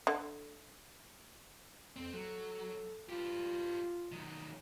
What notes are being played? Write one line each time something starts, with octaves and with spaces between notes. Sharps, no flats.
D3
F2 C4
F#3 A4
F4 G4 B4
D#3 F#3